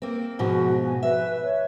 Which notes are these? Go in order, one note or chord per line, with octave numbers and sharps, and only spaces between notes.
A#3 C4
G#2 B2 F3 F#4
G#5
B4 E5
C#5